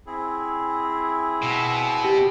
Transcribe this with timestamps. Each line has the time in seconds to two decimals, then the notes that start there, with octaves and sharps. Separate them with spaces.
0.06 C4 E4 G#4
1.42 B2
2.05 G4